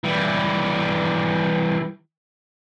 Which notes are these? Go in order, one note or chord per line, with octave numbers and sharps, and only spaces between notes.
E3 G3